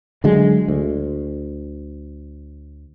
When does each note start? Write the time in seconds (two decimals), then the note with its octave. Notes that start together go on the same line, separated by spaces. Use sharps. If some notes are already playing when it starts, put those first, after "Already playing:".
0.24 D3 F#3 G#3 A3
0.68 D2